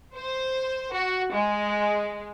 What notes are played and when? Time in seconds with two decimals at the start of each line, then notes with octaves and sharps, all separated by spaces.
0.15 C5
0.95 F#4
1.33 G#3